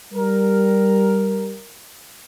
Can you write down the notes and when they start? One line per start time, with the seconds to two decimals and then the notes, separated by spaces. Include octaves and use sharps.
0.13 G3 A#4